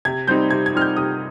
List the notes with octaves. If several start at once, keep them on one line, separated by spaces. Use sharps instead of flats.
C3 G#6
G3 C4 D#4 G6
C3 G#6
G#6
G3 C4 D#4 F6
G6
C3 D#6